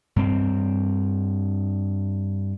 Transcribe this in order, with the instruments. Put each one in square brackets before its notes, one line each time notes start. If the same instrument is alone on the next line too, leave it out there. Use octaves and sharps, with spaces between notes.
[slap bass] G2 C4